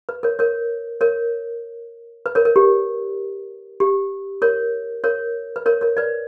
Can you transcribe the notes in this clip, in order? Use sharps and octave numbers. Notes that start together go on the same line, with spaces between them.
B4
A#4 C#5
A#4 C#5
A#4 C#5
B4
A#4 C#5
A#4
G4
G4
A#4 C#5
A#4 C#5
B4
A#4 C#5
A#4 C#5
B4 D5